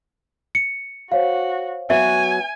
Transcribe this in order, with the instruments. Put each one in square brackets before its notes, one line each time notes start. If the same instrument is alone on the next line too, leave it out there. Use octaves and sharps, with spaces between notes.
[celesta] C#7
[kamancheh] F#4 [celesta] C5 C#5 F5
[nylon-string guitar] F#3 B3 F#4 [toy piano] E5 [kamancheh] G#5